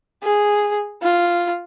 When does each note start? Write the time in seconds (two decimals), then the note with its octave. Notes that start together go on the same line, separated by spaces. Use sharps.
0.23 G#4
1.02 F4